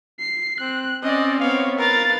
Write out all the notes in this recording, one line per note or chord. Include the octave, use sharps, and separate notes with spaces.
C7
C4 F#6
C4 C#4 D5 D#5
B3 C4 C#5 F5
A#4 B4 F5 A6